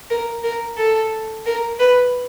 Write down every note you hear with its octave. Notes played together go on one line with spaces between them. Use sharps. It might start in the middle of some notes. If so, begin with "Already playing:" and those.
A#4
A#4
A4
A#4
B4